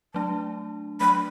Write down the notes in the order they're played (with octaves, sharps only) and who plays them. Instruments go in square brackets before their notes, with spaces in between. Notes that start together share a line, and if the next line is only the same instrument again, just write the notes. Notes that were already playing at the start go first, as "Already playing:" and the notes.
[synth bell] F#3 A3 D4 [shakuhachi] A5
[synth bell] F#3 A3 D4 [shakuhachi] B5